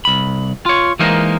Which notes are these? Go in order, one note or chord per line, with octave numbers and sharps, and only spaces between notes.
C2 B5
F4 C#5
E3 G#3 A#3 D#4 A#4 C5